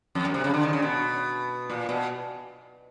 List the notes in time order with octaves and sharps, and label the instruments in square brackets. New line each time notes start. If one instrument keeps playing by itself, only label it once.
[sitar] F2
F#2
C3
C#3
D3
D#3
C#3
B2
A#2
B2